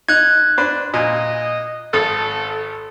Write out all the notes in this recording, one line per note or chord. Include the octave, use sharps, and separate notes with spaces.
D#4 F#6 G#6
D4 B4 C5
A#2 D#5 G#5
G#1 A4 D#6